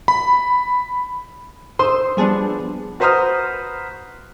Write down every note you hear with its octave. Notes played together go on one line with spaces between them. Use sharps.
B5
C5 C6 D#6 E6
F3 G3 B3 D4 G#4 A5
F#4 B4 C5 A#5 D#6 F6